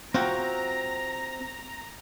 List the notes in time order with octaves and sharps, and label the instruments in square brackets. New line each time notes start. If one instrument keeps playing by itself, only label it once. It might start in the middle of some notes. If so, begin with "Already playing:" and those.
[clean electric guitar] C4 [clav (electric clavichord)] F4 F#4 G5 [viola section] A#5